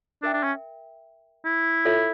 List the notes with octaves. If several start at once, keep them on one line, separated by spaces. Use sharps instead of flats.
D4 A#4 E5 G5
D4
C#4
E4
F4 A4 C#5 E5